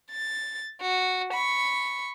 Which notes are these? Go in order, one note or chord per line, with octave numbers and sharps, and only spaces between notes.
A6
F#4
B5 C#6